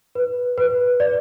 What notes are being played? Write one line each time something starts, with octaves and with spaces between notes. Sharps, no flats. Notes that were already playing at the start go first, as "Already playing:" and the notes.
B4
B4
D5